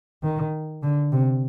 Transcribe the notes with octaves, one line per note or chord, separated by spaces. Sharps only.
D#3
D3
C3